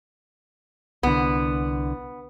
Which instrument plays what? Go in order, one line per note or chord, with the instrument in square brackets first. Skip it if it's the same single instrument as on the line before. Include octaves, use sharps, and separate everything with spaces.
[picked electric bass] C2 D3 [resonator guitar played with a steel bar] B3